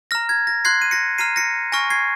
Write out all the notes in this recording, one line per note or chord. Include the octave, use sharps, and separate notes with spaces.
A#5 F6 A#6
G#6
A#6
C6 F#6 G#6 C7
D#7
A#6 C#7
A#5 F6 C7 D#7
A#6 C#7
G#5 C#6 F6 A#6
G#6 C7